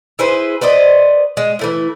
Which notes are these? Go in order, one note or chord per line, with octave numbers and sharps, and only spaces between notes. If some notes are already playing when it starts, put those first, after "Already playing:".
E4 G#4 B4 C5
B4 C5 D5 D#5
G#3
E3 A3 E4